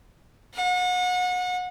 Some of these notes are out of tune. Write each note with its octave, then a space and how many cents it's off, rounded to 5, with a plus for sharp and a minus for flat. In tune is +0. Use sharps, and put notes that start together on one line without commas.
F#5 -35